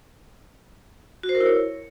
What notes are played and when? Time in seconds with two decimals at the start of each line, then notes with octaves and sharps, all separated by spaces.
1.23 F#4
1.29 C5
1.35 A#4
1.41 E4
1.46 C#5